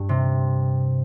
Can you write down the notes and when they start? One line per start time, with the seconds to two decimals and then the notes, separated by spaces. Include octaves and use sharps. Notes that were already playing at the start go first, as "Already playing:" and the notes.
Already playing: G2
0.09 C3